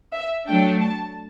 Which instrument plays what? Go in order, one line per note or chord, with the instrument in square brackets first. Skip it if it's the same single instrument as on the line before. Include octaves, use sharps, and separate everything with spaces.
[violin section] E5
[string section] F#3 A3 D4 [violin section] G5
[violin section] A5